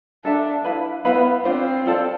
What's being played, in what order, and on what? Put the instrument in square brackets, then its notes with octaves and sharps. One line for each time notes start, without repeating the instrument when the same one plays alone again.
[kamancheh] D4 [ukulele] A4 E5 A5
[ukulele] E4 B4 F5 B5
[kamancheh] B3 [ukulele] E4 B4 F5 B5
[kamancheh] C4 [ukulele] D4 F4 C5
[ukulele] F4 A4 D5 A5